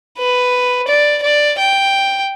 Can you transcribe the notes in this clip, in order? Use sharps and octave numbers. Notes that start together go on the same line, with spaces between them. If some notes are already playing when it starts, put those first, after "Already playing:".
B4
D5
D5
G5